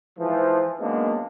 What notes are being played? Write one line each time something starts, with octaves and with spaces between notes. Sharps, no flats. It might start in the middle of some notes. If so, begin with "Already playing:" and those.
G#2 E3 F3
F#2 G#3 A#3 B3 D4